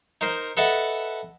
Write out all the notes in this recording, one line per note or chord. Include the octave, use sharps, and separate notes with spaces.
D#4 A#4 C5 D#5
A4 B4 D#5 E5 F#5 A5